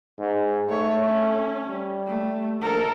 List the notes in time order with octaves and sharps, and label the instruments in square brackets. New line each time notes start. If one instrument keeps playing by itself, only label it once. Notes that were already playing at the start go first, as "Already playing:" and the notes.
[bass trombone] G#2
[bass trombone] A3 [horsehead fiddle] C#5
[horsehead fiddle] C#4
[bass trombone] G3
[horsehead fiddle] A3
[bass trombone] A#1 [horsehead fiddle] A4 A#4